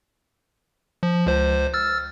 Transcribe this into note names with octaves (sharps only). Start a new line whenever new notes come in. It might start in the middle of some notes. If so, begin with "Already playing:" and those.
F3
C#2 C5
E6 F6 A6